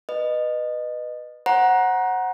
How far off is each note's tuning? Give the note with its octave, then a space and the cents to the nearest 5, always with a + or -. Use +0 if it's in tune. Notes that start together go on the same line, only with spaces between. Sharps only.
B4 +0 D#5 -20
C5 +30 F#5 +0 A#5 +20